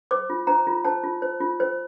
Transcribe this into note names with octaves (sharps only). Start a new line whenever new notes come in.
C5 D6
F4
C5 A#5
F4
C5 A5
F4
C5
F4
C5